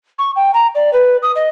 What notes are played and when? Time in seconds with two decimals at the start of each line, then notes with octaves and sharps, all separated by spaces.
0.18 C#6
0.36 G5
0.54 A#5
0.75 D5
0.93 B4
1.23 D#6
1.36 D#5